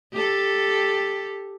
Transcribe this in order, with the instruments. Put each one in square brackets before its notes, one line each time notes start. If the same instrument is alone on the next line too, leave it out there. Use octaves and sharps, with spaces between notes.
[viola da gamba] G4 A4